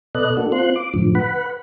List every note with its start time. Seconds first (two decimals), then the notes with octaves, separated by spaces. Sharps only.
0.15 B2 A4 B4 D5 D#5 F#6
0.37 A#3 D4 F#4 A4
0.52 C4 F4 C6 F#6
0.76 D6
0.94 F#2 A2 D3 F3
1.15 B4 F#5 B5